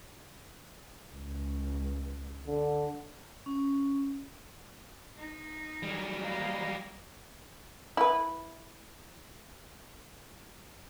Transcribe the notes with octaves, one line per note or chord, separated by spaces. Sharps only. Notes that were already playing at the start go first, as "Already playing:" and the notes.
C#2
D3
C#4
D#4
F#3 G3
A#3 D#5
E4 B4